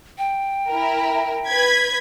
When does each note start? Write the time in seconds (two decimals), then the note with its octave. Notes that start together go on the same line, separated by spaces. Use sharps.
0.18 G5
0.68 E4 A#4
1.47 B4 G#6 B6